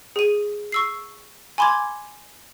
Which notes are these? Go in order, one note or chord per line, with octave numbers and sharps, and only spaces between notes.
G#4 D#7
C#6 E6 C7
G#5 B5 C6 D6 G#6